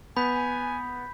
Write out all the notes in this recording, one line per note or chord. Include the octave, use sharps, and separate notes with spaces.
B3 G#5 B5 G6 B6